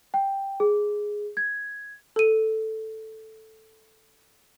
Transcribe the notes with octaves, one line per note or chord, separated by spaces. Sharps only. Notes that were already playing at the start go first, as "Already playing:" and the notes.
G5
G#4
G#6
A4 D#7